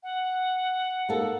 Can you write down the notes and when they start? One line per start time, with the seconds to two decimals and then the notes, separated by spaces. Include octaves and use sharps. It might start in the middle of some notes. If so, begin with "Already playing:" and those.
0.03 F#5
1.09 A#3 D#4 A4